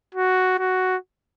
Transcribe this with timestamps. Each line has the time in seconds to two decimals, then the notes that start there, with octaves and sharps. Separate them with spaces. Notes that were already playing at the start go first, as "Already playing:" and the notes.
0.15 F#4
0.58 F#4